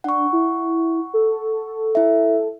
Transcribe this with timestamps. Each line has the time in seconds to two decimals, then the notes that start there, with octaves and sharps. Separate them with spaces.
0.04 D4 F#5 C#6
0.33 E4
1.14 A4
1.95 E4 E5